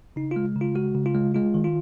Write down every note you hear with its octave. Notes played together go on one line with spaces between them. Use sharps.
C#3 D#4
G#3 F4
C#3
F4
G#3 F#4
C#3
F4
G#3
G#3 F4
D#3
F4